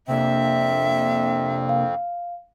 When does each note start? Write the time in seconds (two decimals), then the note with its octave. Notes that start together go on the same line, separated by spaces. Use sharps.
0.08 F2 C3 A#3 C4 D4 E5
1.69 F5